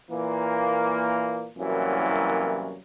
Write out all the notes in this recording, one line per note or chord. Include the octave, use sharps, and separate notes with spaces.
A#2 E3 A#3
C2 F#2 E3 F#3 A#3